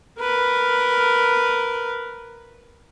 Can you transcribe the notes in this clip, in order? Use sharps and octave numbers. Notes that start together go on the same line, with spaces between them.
A#4 B4